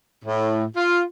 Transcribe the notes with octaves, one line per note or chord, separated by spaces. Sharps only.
A2
F4